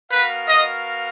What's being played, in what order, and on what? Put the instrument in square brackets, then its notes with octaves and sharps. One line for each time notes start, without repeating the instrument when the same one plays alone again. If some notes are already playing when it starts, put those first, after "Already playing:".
[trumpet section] B3 F#4 A#4 F5 [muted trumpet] B4
[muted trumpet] D#5